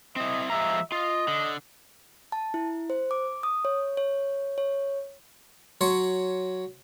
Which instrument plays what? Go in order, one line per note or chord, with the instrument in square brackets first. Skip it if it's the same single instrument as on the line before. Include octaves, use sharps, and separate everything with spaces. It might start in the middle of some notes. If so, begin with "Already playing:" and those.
[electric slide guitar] C4 E4 [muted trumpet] D#5
[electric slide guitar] F3 G#3 A#5 [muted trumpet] E5
[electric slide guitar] F4 [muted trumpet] D#5
[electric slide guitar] D3
[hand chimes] A5
E4
C5
D6
D#6
C#5
C#5
C#5
[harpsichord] F#3 C#5 C6